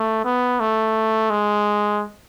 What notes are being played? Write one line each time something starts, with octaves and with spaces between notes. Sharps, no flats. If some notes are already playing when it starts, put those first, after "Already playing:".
Already playing: A3
B3
A3
G#3